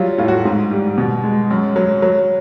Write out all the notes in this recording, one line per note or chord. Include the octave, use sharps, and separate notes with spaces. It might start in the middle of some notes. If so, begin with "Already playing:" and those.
Already playing: F#3 G3 F4
A2 F4
F#4
G#2
G3
B2
G#3
F#2
F#3
F#3